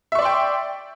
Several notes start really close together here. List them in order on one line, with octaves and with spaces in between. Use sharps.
E5 C#6 D5 C6 G5